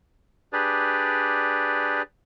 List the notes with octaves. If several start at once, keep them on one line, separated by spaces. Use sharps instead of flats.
D4 G4 G#4 B4 D5